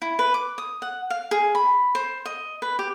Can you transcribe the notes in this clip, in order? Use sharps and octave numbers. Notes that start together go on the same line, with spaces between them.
E4
B4
D6
D#6
F#5
F5
G#4
B5
C5
D#5
B4
G4